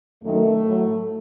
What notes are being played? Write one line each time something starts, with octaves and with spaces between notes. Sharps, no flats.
F#2 D#3 F#3 A3
A2 F#3